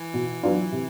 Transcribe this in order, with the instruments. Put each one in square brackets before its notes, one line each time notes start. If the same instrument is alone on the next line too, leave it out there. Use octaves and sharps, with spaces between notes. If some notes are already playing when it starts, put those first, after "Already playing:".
Already playing: [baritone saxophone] E3
[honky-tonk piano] B2
F#3 B3 D4 F4
C3